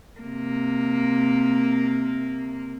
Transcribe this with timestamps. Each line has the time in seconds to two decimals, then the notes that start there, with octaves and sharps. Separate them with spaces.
0.20 C3 A#3